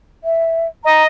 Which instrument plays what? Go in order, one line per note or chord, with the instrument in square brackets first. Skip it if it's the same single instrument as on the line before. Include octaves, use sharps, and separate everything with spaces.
[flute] E5
[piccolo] D#5 [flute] A#5